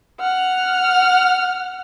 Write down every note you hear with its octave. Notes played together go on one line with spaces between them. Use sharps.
F#5 F6